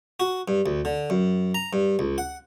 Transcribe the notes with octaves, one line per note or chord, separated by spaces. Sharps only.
F#4
G2
D2
D3
F#2
A#5
G2
C#2
F#5